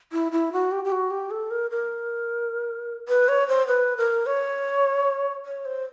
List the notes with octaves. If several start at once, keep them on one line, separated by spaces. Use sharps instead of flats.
E4
E4
F#4
G4
G4
F#4
G4
A4
A#4
A#4
B4
C#5
C5
B4
A#4
C#5
C#5
C5